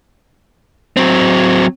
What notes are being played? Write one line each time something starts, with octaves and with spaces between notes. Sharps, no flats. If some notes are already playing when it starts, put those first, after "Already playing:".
F#3 C4